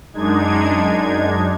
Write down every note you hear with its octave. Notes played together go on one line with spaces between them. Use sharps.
F#2 G#3 D4 D#4 G#6